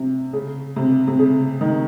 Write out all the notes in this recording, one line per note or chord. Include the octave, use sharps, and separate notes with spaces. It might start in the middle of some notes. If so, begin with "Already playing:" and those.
Already playing: C3
C#3
C3
C3
C#3
D#3